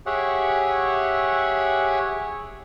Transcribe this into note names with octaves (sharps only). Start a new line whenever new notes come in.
G4 G#4 C#5 E5 F#5